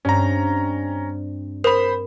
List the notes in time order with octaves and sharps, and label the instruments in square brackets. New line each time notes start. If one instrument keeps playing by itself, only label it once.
[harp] G2 C4 [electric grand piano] C#4 A#5
[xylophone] A#4 [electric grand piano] C5 B5